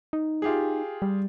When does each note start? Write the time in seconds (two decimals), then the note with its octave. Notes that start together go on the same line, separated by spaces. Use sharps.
0.13 D#4
0.42 F4 G4 G#4
1.02 G3